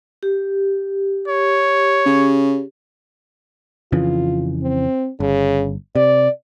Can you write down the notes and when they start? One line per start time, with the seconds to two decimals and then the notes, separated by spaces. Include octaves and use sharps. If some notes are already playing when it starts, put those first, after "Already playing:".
0.23 G4
1.28 C#5
2.06 C#3
3.92 F2 C#3 E3 F4
4.62 C4
5.20 G1 C#3
5.95 C3 D5